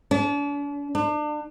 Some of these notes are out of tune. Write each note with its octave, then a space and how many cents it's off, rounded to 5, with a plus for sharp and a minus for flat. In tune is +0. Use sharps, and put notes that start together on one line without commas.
D4 -40
D4 +35